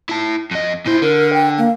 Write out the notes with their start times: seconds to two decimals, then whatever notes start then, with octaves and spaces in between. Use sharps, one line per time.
0.09 E4 A5
0.51 F2 D#5
0.86 A#2 E4 C5
1.02 D3 A#4
1.33 G5
1.58 A#3